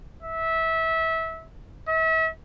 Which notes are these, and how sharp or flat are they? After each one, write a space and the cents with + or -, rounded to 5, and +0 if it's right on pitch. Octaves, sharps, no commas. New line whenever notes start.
E5 -20
E5 -35